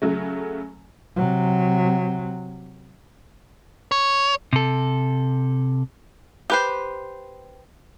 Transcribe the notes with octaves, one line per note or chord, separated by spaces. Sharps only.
C#3 F#3 A3
C3 F#3
C#5
C3 A4
G4 B4 C5